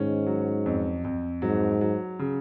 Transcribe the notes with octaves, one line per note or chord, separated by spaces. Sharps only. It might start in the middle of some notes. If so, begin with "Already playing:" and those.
Already playing: G#2 D#3 C#4
F#3
F2
F2
G#2 F#3
F#3
C#3